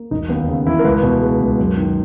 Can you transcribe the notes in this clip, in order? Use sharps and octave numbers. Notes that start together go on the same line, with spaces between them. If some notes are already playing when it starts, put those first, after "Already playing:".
Already playing: A#3
E1 D#4
D#2 B3
C#3
E3 E4
A#4
C#2 B4
B2
G#3
C#2
F#2
D#3